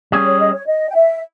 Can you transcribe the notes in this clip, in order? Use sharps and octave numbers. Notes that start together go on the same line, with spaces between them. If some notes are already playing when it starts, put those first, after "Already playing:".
G3 C#4 G#4
C#5
D#5
C#5
D#5
G5
E5